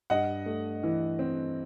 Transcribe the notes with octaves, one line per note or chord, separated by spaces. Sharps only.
G2 D#5 F#5
A3
E3
C4